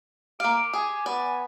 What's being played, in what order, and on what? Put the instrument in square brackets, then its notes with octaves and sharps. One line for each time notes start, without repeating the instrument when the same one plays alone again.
[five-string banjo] A#3 F5 [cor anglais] G4 [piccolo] D7
[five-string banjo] G#4 [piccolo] G#5
[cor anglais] B3 [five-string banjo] D5